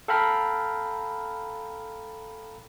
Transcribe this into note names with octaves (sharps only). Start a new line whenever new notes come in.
A4 F5 G5 A#5 B5 F6